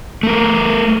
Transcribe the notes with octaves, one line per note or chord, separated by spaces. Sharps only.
A3 A#4